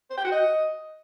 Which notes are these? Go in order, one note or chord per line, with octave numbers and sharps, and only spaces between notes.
C5
G5
F#4
D#5